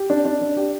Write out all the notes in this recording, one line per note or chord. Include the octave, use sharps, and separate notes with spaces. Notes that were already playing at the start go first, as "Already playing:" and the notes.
Already playing: G4
D4
D4
D4
G4